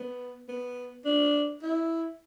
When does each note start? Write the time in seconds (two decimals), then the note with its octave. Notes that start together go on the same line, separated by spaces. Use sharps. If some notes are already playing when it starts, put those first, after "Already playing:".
Already playing: B3
0.48 B3
1.05 D4
1.63 E4